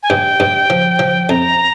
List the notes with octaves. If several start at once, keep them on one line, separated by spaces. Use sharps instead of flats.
G#5
G2 G5
G2
F3
F3
F2 A#5